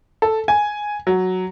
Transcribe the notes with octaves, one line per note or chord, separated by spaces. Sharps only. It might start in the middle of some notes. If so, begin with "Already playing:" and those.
A4
G#5
F#3